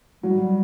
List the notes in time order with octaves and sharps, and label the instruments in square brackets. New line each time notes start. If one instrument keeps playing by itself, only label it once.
[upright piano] F#3 [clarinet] G3